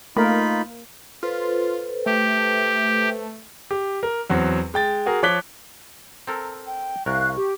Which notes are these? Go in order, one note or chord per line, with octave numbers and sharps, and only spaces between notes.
A3 A#3 D#4 F4 A#4 B5
F4 A4 B4 C5
A3 G4
G4
A#4
E2 F#3 C4
G#3 G5 A6
F#4 G#4 A#4
F3 C#5 D6 F#6 B6 G7
C4 A4 A#4 A#5
G5
C2 A#4 F5 C#6 F#6
G4